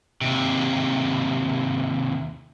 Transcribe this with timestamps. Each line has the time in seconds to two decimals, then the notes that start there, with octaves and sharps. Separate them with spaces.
0.21 D#2 C3